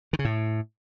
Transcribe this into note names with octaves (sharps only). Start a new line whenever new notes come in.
D#3
C#3
A2